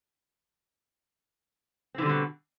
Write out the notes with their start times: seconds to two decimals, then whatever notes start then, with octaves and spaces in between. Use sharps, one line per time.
1.94 C4
1.98 E3
2.02 D3
2.06 G3
2.09 B2